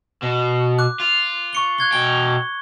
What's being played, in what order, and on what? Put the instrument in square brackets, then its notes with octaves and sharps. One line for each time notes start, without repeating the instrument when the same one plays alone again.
[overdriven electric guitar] B2
[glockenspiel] D6 F#6
[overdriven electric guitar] F4
[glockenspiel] C#6 C#7 G7
F#6 G#6 G7
[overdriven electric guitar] B2 G5 [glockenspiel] G7